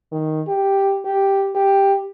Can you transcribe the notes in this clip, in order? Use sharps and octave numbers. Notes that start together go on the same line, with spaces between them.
D#3
G4
G4
G4